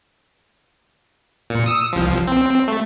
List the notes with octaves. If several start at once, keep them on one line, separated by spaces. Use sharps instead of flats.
A#2 C#7
D#6 E6
C2 F3
C4
A3